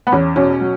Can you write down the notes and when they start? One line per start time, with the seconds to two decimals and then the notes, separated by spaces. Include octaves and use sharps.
0.07 B3
0.12 E2 C#4
0.36 B2 C#4
0.61 F#3